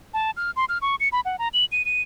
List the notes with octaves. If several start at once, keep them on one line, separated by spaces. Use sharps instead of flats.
A5
F6
C6
F6
C#6
C#7
B5
F#5
A#5
F#7
D#7
D#7